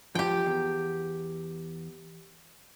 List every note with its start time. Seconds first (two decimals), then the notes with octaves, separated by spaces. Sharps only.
0.15 F3 G4 G5
0.46 E2